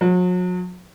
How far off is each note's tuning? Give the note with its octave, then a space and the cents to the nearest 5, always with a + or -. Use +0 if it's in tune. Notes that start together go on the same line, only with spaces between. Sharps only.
F#3 -40